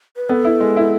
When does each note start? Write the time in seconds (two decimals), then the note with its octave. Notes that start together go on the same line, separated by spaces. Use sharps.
0.16 B4
0.29 B3 A4
0.45 E4
0.60 G#3
0.77 E4